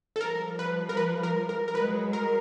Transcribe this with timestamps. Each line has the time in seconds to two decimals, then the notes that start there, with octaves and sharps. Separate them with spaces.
0.16 A4
0.20 F3 G3 A#4
0.59 B4
0.89 A#4
0.97 B4
1.23 A#4
1.49 A#4
1.68 A#4
1.75 F#3 G#3 B4
2.13 A#4